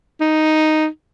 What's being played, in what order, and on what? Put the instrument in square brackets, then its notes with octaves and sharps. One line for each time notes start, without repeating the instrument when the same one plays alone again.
[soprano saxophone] D#4